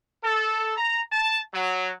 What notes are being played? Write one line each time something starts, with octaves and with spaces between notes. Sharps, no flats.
A4
A#5
A5
F#3